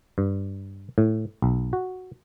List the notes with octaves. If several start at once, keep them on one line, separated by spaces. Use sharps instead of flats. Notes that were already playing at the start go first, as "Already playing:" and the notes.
G2
A2
B1
F#4